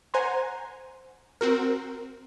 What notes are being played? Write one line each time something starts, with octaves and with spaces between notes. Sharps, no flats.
C5 F#5 G#5 A#5 C6
C4 F#4 A#4